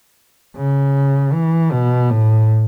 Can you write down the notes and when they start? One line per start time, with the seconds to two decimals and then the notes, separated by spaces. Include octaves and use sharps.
0.56 C#3
1.33 E3
1.72 B2
2.10 A2